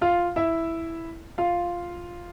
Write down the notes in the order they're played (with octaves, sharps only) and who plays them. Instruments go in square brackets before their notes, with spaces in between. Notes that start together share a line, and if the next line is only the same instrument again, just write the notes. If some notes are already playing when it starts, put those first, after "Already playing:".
[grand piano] F4 F5
E4 E5
F4 F5